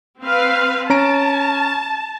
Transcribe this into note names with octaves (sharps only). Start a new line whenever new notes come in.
C4 B4 F5
C#4 A5 A#5 D7